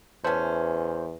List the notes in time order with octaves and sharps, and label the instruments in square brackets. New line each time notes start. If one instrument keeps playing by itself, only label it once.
[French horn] E2 [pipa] A3 C#4 [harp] B4 [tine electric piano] C5